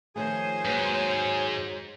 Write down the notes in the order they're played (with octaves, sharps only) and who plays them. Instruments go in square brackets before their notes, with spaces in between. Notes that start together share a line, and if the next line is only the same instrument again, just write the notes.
[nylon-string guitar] D#3 F3 A3 [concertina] G#4 [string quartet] C5 C#5 G#5
[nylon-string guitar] D#2 F#3 B4 [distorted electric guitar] G#2